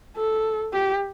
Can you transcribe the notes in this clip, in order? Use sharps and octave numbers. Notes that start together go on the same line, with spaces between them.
A4
G4